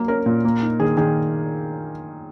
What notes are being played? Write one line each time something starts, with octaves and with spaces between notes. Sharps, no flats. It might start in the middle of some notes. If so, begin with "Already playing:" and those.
Already playing: F#3 A#3
C#4 A#4
A#2
A#3
D#4
D#3 G#4
D#3 G#4